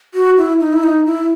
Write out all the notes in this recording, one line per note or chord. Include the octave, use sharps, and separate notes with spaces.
F#4
E4
D#4
E4
D#4
E4